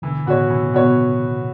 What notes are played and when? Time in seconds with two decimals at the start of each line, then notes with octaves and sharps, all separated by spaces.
0.02 B2 D3 E3
0.26 A2 C#3 B3 F#4 C#5
0.50 B2 E3
0.65 B2
0.74 B3 F#4 C#5
0.81 B2